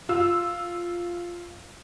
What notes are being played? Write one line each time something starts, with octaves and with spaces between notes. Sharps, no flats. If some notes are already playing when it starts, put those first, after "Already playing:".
F4 E6